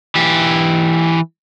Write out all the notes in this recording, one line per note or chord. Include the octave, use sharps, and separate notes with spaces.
E3 G4